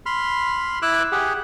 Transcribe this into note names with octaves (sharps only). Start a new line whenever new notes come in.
B5 C6 F6
E4 D6 E6 F#6
G4 G#4 F#5